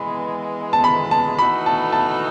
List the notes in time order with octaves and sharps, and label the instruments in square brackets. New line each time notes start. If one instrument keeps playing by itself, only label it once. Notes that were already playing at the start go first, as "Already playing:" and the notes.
Already playing: [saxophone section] E3 G#3 B3 [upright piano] B5
[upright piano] A5
B5
A5
[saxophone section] E3 A3 D#4 F#4 A4 [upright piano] B5
[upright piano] A5
A5